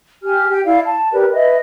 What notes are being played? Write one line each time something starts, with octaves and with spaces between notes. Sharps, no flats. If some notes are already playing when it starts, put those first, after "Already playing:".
G4 G#5 F6
G4 G5
E4 D5 F5
A5
G4 A#4 B4 D5
B4 D#5 E5